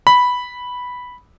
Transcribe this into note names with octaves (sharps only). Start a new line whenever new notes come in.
B5